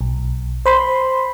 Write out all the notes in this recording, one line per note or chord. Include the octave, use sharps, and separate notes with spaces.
B1
C5 B5 C6